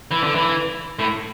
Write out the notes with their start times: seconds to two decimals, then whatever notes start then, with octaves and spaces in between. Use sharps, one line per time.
0.11 E3
0.23 D3
0.35 E3
0.99 A2